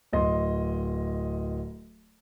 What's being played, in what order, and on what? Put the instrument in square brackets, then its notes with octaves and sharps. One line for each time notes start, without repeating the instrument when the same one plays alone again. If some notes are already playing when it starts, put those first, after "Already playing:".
[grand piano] D1 D#5 C6